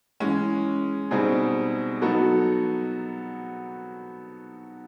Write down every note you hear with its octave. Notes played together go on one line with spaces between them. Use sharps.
E3 G#3 C#4
B2 G3 C4 D#4 G#4
F#3 B3 D#4 F#4 A4